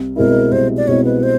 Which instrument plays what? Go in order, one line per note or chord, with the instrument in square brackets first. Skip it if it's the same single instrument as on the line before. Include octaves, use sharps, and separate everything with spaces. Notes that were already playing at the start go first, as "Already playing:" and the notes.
Already playing: [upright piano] C2
[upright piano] B2 G#3 C4 E4 [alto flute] A#4
[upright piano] C2 [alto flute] C5
[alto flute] D5
[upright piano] B2 G#3 C4 E4 [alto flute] C#5
[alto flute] B4
C5